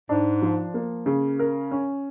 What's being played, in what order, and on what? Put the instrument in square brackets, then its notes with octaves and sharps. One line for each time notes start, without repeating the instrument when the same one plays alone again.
[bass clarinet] G#2 [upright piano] D4
[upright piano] F3
A#3
C#3
A#4
C#4